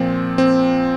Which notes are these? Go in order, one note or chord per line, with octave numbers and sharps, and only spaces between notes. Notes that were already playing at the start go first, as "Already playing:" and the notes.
Already playing: A#2 F3 C4
C4